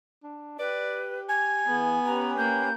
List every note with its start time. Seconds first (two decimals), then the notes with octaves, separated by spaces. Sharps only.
0.23 D4
0.59 G4 B4 D5
1.29 G#5 G#6
1.66 E3 B3 G#4
2.06 C#4 G4 B4 A#5
2.38 A#3 G6